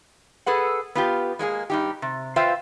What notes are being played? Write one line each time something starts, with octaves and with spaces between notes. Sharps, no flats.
G#4 A4 B4 F#5
B3 F4 G4
G#3 A#3 D4 G#4
G2 D#4 G4
C3
F4 B4 C5 E5 F5 G5